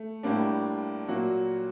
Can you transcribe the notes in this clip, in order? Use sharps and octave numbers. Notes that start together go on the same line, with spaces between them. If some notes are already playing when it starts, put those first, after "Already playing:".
Already playing: A3
A2 G3 A#3 D4
A#2 F#3 A#3 F#4